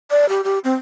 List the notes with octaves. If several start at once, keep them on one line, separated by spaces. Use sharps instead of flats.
D5
G4
G4
C4